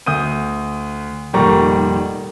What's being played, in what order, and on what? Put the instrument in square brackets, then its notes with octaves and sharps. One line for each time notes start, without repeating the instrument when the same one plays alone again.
[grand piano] D2 D#6 G6 D#7
F1 A#2 D#3 G3 A#5 C#6